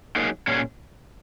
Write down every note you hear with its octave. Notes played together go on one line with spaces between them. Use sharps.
F#3 A#3 D#4 G#4
A#2 F#3 C#4 G#4